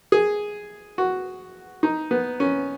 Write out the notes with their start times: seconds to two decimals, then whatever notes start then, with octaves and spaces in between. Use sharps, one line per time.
0.12 G#4
0.98 F#4
1.83 D#4
2.11 B3
2.40 C#4